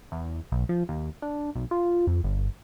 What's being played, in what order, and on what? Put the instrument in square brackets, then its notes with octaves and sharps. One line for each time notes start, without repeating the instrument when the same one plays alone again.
[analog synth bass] E2
B1
F3
D#2
D4
B1
F4
F2
G1